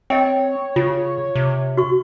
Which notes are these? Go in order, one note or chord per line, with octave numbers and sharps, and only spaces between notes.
C4 C#5 D#5 G5
C#3 F4
C3
F#4 C#6